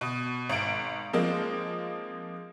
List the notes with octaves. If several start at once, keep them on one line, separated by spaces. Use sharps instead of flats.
B2
G#1 D7
F3 G#3 A#3 C4 D#4